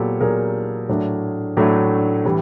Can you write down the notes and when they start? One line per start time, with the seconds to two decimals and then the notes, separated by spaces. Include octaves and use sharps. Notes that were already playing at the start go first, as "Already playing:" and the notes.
Already playing: A#2 F#3 B3 G4 A4
0.20 A#2 F#3 B3 G#4 A#4
0.89 A2 F#3 A3 D4
1.57 A2 F#3 A3 D4
2.25 A2 E3 G3